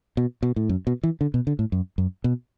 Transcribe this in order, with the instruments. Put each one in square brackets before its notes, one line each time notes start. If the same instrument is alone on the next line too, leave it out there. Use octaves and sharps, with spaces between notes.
[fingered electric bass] B2
B2
A2
F#2
B2
E3
D3
B2
D3
A2
F#2
F#2
B2